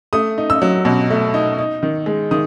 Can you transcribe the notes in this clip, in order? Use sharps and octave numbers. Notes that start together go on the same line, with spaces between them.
A3 D#6
D#4
E6
F#3
B2
A3
D#4
D#4
D#3
G#3
D#3 D#6